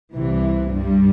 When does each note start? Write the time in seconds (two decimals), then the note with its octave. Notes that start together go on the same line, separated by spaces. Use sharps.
0.13 C2 C3 E3
0.70 G2 G3